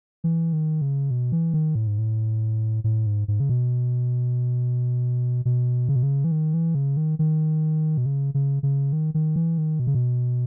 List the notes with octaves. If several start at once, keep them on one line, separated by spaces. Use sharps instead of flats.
E3
D#3
C#3
B2
E3
D#3
A2
G#2
A2
A2
G#2
G#2
C#3
B2
B2
C#3
B2
C#3
E3
D#3
E3
C#3
D#3
D#3
B2
C#3
C#3
C#3
D#3
D#3
E3
D#3
B2
C#3
B2